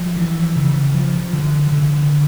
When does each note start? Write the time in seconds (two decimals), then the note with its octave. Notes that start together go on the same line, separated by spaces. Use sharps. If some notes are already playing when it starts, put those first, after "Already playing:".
Already playing: F3
0.17 E3
0.56 C#3
0.94 F3
1.33 D3
1.72 D3